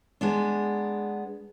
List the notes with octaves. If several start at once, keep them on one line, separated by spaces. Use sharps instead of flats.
G#3 B3 D4